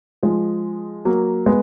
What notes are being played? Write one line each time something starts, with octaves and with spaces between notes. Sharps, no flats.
F3 G#3
F#3 A#3
G#3 B3